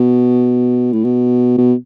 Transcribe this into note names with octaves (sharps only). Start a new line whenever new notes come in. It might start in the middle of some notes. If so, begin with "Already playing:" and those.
Already playing: B2
A2
B2
B2